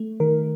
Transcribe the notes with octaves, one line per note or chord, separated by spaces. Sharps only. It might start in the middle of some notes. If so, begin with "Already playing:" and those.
Already playing: A3
D#3 A#4